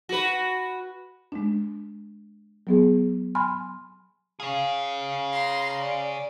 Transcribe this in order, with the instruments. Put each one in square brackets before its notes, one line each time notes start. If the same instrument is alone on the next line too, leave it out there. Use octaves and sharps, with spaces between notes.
[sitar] F#4 B4
[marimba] G#3 D4
F#3 B3 G#4
G#5 B5 C6 F6
[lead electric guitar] G#4 C#5 [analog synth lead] F5
[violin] A#5 C6
D5